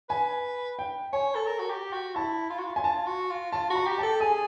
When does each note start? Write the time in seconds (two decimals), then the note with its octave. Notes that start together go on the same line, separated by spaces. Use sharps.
0.09 B4 G#5
0.79 G5
1.13 C#5 G#5
1.35 A4
1.46 A#4
1.59 F#4
1.70 G4
1.93 F#4
2.15 E4 A5
2.50 F4
2.58 F#4
2.66 F4
2.76 G#5
2.84 F4 A5
3.06 F#4
3.30 F4
3.52 F4 A5
3.70 F#4
3.76 A#5
3.87 G4
3.98 A4 A5
4.20 G#4 G#5